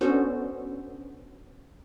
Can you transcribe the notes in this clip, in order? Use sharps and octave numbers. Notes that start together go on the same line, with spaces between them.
B3 C#4 D4 F#4 A4 C5